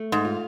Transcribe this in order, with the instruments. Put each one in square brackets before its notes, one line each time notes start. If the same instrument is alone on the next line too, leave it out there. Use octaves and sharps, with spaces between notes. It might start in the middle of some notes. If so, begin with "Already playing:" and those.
Already playing: [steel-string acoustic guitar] A3
[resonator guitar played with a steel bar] G#2
[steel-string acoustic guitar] F4